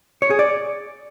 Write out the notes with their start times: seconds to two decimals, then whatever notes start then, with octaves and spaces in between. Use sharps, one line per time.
0.22 C#5
0.30 G#4
0.39 D5